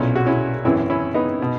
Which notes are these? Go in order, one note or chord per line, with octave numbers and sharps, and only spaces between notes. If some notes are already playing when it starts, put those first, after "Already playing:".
Already playing: B1 A#2 C#4 E4
F#4
C#4 E4
G#1 F#2 E3 C#4 E4
C#4 E4
B3 D#4
B2